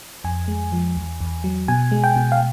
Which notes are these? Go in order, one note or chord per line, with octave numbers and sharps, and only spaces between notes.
F2 G#5
G#3
F3
E2
E2
F#3
B2 G#5
G#3
G5
B2
F5